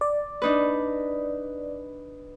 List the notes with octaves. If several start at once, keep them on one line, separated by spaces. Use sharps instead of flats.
D5
D4 D#4 B4